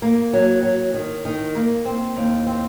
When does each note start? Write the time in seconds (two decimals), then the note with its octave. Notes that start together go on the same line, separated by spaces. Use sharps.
0.02 A#3
0.33 F#3
0.63 F#3
0.94 D#3
1.25 D#3
1.55 A#3
1.85 C4
2.17 D#2
2.47 C4